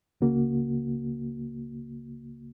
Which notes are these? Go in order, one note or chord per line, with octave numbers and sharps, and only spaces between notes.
C#2 C#3 A#3 F#4